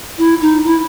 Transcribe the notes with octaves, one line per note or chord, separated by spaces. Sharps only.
E4
D#4
E4